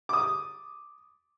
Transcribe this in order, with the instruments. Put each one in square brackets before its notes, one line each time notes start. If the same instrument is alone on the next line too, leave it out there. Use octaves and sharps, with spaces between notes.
[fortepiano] D6 D#6